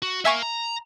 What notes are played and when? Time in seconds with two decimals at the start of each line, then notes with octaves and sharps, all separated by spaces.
0.02 F#4
0.25 A#4 E5 F5 G#5 C#6
0.43 A#5